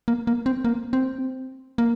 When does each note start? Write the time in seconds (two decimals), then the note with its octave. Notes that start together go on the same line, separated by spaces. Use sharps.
0.08 A#3
0.27 A#3
0.46 C4
0.65 A#3
0.93 C4
1.78 A#3